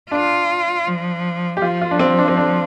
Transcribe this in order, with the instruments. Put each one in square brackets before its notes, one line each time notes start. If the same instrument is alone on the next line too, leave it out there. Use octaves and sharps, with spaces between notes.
[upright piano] D4 [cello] F4
[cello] F3
[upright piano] G4
[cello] F3 [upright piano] F4
[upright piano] F4
D4
C4
D4
C4
D4